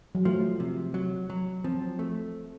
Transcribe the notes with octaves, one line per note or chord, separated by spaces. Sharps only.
F#3
F3 A3
C3
F#3
F#3
F3 C4
A3